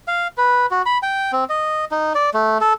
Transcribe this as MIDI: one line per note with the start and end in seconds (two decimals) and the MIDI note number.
0.08 0.27 77
0.38 0.66 71
0.71 0.82 66
0.86 0.98 83
1.03 1.31 79
1.32 1.44 60
1.49 1.85 75
1.91 2.13 63
2.15 2.30 74
2.34 2.58 57
2.61 2.73 69